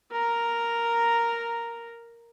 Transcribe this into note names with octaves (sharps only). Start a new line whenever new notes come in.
A#4 A#5